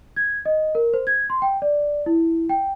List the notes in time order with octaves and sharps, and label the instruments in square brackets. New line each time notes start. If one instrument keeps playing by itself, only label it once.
[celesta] G#6
D#5
A#4
C5
G#6
C6
G5
D5
E4
G5